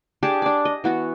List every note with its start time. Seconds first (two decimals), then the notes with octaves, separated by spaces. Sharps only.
0.23 D4 G4 G#4 A5
0.42 D4 D5
0.65 D#5
0.84 E3 B3 F#4